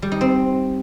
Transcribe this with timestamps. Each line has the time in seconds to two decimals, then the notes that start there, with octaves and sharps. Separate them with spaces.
0.02 G3
0.12 D#4
0.21 C4